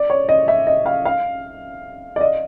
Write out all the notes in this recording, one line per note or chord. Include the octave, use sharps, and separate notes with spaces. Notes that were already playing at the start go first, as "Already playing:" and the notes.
Already playing: D5
C#5
D#5
E5
D#5
F5
F5
D5
D#5